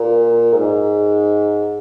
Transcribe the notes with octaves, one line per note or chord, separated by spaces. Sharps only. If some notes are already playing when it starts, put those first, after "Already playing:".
Already playing: A#2
G#2